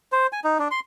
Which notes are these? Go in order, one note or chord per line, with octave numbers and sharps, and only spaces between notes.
C5
G#5
D#4
D4
C6